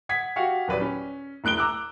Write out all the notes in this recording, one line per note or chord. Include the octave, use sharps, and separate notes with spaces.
F#5 G#6 B6
F#4 G4 F5 F#5 C#6
D#1 F#3 B4 D5
C#4
E1 A2 F#6 D7 G7
A#5 D6 E6 F#6